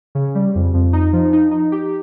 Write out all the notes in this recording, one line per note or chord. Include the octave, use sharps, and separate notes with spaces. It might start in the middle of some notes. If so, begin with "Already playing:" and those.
C#3
G3
F2
F2
D#4
F3
D#4
D#4
G4